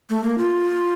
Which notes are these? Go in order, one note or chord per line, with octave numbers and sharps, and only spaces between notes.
A3
A#3
F4